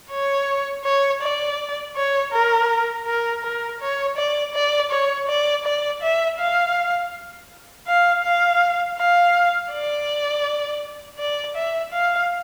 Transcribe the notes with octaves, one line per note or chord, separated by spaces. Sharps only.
C#5
C#5
D5
C#5
A#4
A#4
A#4
C#5
D5
D5
C#5
D5
D5
E5
F5
F5
F5
F5
D5
D5
E5
F5